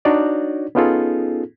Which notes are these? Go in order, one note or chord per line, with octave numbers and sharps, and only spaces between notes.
D4 D#4 F#4 C#5 D5
B3 C#4 D#4 F4 G#4 A4